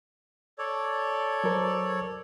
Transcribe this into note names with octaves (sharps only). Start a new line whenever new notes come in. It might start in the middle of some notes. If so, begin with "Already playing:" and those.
A4 C#5 D5
F#3 A#4 C5